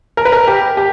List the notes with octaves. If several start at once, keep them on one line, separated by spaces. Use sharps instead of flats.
A#4
B4
A#4
G4
G4